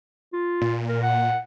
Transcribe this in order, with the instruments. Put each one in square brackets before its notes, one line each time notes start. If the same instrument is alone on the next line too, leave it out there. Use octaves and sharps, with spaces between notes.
[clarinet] F4
[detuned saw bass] A#2
[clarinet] A#4
F#5